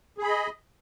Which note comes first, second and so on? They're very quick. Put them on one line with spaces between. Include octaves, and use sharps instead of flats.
G#4 B5 D#5